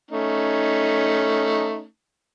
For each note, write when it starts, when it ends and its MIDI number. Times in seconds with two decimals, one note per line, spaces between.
0.11 1.84 57
0.11 1.84 61
0.11 1.84 63